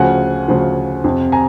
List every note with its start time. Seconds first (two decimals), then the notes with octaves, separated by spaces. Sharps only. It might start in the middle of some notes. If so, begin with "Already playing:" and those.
Already playing: D2 C#3 F3 F#5 G#5
0.48 D2 C#3 F3
1.04 F2 C3 F3
1.32 G#5 A#5